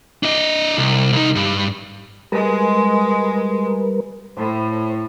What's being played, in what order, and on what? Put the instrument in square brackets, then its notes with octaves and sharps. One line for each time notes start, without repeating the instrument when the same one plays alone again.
[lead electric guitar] D4 D#5
C2
C2 D#4
G2
[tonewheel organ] G3 A#4 B4 [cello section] G#3
[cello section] A2 [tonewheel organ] C5